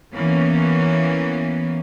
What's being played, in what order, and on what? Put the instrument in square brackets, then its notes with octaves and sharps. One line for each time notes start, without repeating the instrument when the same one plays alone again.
[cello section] E3 A#3 B3 C#4